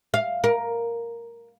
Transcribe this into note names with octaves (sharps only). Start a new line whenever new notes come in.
F5
A#4